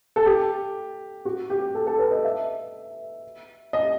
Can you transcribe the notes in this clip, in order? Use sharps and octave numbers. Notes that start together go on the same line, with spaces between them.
A4
G4
F#4
G4
A4
A4
B4
D#5
E5
D#5